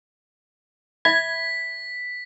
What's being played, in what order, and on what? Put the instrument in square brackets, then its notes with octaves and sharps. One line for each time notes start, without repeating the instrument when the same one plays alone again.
[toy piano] E5 B5 [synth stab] G#6 [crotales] B6